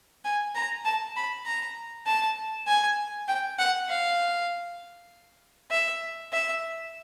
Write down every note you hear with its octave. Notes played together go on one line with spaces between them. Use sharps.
G#5
A#5
A5
B5
A#5
A5
G#5
G5
F#5
F5
E5
E5